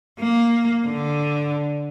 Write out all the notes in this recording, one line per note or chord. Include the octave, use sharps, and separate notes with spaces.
A#3
D3